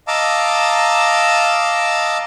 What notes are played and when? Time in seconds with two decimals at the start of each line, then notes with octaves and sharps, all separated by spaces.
0.07 D#5 F5 A5 A#5 D6 E6